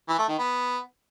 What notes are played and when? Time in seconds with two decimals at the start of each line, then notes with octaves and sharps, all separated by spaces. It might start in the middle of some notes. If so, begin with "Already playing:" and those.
0.08 E3
0.18 A3
0.28 D#3
0.38 B3